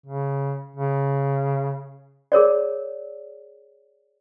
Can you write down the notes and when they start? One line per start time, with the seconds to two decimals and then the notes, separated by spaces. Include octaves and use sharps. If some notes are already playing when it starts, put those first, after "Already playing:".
0.06 C#3
0.76 C#3
2.32 G#4 A#4 C#5 D5